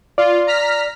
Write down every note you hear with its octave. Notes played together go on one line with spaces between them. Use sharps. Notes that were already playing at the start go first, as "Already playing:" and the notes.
F4 D5
A#5 F6 B6